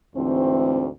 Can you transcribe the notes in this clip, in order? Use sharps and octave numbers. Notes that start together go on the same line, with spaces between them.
D2 G#2 E3 A3 C4